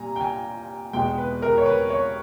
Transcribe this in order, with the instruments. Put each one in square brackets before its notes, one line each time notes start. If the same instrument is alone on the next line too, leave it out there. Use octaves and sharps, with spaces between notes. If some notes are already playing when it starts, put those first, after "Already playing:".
Already playing: [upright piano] A#2 G3 G#5 A#5
G5
G#5
E2 B2 G#3 G5
B4
A#4
C#5
B4
C#5